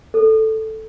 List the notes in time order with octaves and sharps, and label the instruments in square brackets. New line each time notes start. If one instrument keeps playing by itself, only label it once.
[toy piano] A4